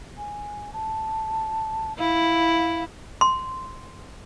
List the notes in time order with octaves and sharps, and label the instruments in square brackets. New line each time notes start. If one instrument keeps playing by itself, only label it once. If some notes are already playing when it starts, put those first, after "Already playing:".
[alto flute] G#5
A5
[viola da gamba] E4 [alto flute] F5
[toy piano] C6